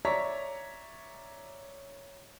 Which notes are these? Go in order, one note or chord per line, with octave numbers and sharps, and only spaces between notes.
C#5 D5 E5 A#5 C#6 B6